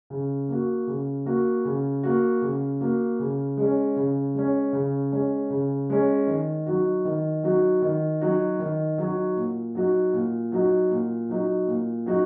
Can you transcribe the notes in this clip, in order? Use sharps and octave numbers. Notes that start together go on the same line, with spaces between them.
C#3
A#3 F#4
C#3
A#3 F#4
C#3
A#3 F#4
C#3
A#3 F#4
C#3
G#3 C#4
C#3
G#3 C#4
C#3
G#3 C#4
C#3
G#3 C#4
D#3
F#3 D#4 F#4
D#3
F#3 D#4 F#4
D#3
F#3 D#4 F#4
D#3
F#3 D#4 F#4
A#2
F#3 D#4 F#4
A#2
F#3 D#4 F#4
A#2
F#3 D#4 F#4
A#2
F#3 D#4 F#4